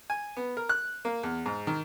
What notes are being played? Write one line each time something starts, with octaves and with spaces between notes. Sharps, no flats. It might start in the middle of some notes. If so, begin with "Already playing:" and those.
G#5
B3
A#4
F#6
A#3
E2
G#2
D#3